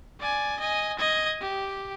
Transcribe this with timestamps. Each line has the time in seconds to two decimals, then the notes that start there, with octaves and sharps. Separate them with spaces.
0.20 D5 G#5
0.59 D#5 G#5
0.99 D#5 G#6
1.41 G4